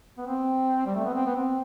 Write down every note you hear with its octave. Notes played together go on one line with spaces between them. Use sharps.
B3
C4
G3
A3
B3
C4
B3
C4